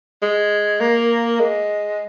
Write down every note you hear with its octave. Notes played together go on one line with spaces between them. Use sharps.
G#3
A#3
G#3